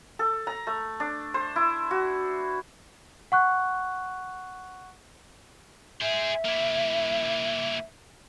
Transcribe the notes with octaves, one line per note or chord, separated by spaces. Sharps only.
A4
A#5
A3
D4
C5
E4
F#4
F#5 C#6 F#6
G#4 C5 E5
A#3 E4